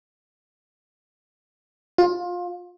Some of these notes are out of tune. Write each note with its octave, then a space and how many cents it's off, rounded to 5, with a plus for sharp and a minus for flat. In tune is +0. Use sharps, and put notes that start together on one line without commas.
F4 +25